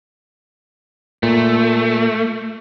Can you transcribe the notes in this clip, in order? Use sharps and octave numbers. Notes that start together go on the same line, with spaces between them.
A#2 A3